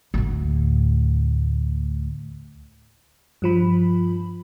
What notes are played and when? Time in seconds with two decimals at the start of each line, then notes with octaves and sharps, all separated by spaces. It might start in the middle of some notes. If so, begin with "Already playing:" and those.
0.14 D2 A2
3.42 G2 F3 B5